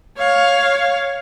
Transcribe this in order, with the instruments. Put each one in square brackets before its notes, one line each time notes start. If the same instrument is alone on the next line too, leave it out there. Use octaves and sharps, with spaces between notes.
[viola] C#5 F5